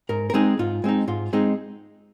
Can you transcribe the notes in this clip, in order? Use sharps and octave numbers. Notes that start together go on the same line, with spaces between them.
G#2 A#4
A#4
G#3 C4 D#4 G#4
G#2 F4
G#3 C4 D#4
G#2 F4
G#3 C4 D#4 G#4